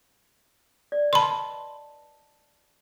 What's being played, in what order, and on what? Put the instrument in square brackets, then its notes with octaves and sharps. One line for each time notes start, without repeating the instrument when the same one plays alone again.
[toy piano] D5
[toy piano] B4 D#5 A5 [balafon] B5 C6